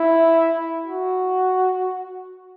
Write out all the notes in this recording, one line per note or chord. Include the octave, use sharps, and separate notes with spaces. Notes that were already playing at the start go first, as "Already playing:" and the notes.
Already playing: E4
F#4